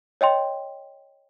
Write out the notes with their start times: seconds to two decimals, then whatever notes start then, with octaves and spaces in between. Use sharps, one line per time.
0.21 C#5 D#5 G5 C6